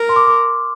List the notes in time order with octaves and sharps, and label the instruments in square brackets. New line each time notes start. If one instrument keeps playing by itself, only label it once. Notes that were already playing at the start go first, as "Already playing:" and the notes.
Already playing: [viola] A#4 [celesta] F6
[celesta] C6
D6
D6